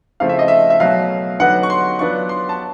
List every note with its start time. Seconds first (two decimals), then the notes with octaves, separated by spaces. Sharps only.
0.20 C#3 F3 A3 C4 E4 F5
0.29 E5
0.39 D#5
0.48 E5
0.70 E5
0.80 B2 F#3 A3 F5
1.40 D3 F#3 B3 D#4 F#5
1.63 C#6
1.70 C6
1.99 F#3 B3 D4 F4 C#6
2.29 C6
2.49 A5